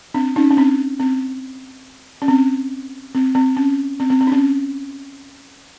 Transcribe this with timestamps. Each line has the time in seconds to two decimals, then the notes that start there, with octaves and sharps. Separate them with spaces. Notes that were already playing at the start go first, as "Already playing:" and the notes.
0.14 C4 D4
0.36 C#4 D#4
0.50 C#4
0.57 C4 D4
1.00 C4
2.22 C#4
2.28 C4
3.15 C4
3.35 C4
3.57 C#4
4.00 C4
4.10 C4
4.21 C4
4.27 D4
4.32 C#4